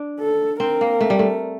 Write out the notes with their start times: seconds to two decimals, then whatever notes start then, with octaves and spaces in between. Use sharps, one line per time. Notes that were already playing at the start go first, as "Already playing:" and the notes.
Already playing: D4
0.19 A4
0.60 C4 A#4
0.81 A#3
1.01 A3
1.10 G3
1.19 A3